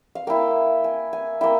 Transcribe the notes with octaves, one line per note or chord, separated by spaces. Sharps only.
F5
A#3 E4 G5
G#5
G#5
A#3 E4 G5